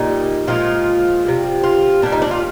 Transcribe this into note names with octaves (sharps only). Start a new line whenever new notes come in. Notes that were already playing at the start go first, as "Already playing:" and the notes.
Already playing: A#2 G3 D#4
A#2 F3 G#3 F4
C3 G3
F4
A#2 G3 D4
D#4
D4
F4